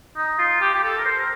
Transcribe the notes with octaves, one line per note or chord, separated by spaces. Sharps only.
D#4
F4
G4
G4
A4
A#4
C5
A#4